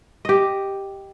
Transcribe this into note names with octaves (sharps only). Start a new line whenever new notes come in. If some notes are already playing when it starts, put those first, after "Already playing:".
G4 D#5